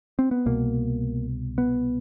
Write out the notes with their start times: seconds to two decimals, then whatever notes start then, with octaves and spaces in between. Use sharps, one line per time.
0.19 C4
0.31 B3
0.46 C2 B2 A#3
1.58 B3